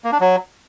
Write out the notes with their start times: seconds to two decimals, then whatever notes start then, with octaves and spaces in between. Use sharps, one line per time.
0.04 A#3
0.12 D4
0.20 F#3